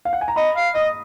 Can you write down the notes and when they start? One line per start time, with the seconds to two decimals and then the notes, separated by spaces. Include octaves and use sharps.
0.05 F5
0.13 F#5
0.21 G#5
0.28 A#5
0.36 D#5 B5
0.56 F5
0.74 D#5 D#6